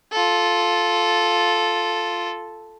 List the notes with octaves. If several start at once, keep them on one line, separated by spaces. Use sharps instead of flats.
F4 A4